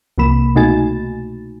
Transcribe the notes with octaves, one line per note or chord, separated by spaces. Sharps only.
C2 C3 F3 A#3 B5 E7
B2 A3 D#4 F#4 G#5 A6